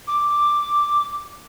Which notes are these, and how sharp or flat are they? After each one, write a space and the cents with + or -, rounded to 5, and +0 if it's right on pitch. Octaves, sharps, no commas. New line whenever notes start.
D6 +0